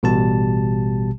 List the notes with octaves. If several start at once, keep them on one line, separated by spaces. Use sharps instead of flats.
A1 B2 G3 G4 A5